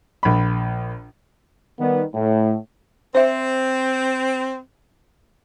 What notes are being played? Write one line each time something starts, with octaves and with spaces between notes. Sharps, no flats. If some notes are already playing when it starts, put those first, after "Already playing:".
A#1 B5
D#3 G3 B3
A2
C4 C5 E5